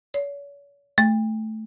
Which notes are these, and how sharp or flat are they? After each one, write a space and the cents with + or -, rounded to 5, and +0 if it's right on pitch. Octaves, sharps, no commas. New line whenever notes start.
C#5 +40
A3 -10